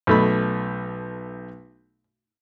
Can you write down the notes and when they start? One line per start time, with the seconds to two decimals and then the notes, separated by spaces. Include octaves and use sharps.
0.07 B1 A3 B5